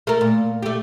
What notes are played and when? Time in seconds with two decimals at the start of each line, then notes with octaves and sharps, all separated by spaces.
0.07 A3 A#4
0.21 A#2
0.63 A3 G4